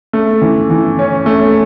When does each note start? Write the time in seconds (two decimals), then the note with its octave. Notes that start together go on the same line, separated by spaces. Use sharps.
0.13 A3
0.42 E3
0.70 E3
0.99 C#4
1.26 A3